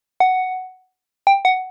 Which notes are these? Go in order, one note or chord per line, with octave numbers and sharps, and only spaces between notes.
F#5
G5
F#5